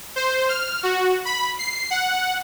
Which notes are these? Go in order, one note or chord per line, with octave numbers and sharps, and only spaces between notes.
C5
F6
F#4
B5
C7
F#5